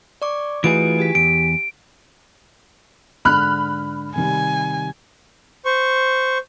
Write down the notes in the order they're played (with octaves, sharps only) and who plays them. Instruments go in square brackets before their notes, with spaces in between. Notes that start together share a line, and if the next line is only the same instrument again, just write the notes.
[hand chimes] D5 C#6 D6
[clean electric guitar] E3 F4 G#4 [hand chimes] A3 F#4 B4 [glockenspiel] D7
[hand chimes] G4 G#5 B6
[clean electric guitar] E2 [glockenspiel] D7
[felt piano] G#2 D3 [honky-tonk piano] B5 F6 F#6
[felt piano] C3 D#3 G3 [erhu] G#5
[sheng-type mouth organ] C5 C#6